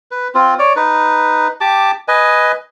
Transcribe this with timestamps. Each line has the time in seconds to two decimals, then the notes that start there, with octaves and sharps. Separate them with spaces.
0.11 B4
0.35 C4 F4
0.59 C#5 D5
0.76 D#4 B4
1.61 G4 A5 D6
2.08 B4 D#5 G#5